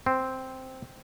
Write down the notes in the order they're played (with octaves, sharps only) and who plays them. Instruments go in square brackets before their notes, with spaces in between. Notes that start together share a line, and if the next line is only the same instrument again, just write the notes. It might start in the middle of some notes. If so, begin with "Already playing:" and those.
[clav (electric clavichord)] C4